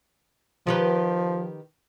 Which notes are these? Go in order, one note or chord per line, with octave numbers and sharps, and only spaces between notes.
D#3 F3 G4 B4